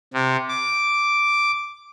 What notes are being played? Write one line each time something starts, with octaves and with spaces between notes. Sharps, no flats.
C3
D6